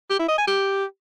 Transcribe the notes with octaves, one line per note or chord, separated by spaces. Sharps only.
G4
E4
D#5
G#5
G4